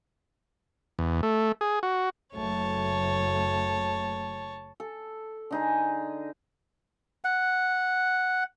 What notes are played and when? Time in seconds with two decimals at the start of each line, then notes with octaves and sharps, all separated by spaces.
0.99 E2
1.23 A3
1.61 G#4
1.83 F#4
2.34 F#1 F#3 A3 C#5 A5
4.80 A4
5.51 D3 D#4 G#4
7.24 F#5